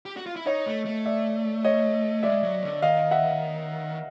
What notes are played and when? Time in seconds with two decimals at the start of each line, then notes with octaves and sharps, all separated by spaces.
0.06 G4
0.17 F#4
0.26 F4
0.36 E4
0.46 D#4 C#5 D#5
0.66 A3
0.85 A3
1.05 D5 E5
1.64 C#5 D#5
2.23 G#3 D5 E5
2.43 F#3
2.63 D3
2.82 D#3 D#5 F5
3.11 E5 F#5